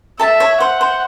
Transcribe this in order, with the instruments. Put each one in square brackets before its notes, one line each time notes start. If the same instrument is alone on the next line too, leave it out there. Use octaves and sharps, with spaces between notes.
[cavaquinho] A4 A5 [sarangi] E5
[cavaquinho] C#5
[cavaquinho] C5 [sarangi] F#5
[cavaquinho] C5